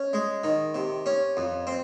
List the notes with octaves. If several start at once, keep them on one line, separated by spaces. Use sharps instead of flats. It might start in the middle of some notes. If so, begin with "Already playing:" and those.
Already playing: C#4
G#3
D#3
C3
C#4
F2
C4